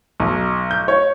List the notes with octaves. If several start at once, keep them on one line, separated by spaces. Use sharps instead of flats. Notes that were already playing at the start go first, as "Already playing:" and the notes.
B1
G6
C#5